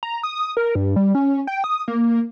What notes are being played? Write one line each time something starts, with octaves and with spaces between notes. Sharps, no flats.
A#5
D#6
A#4
G2
G3
C#4
G5
D#6
A#3